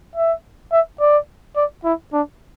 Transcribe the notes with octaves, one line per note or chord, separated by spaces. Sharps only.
E5
E5
D5
D5
E4
D4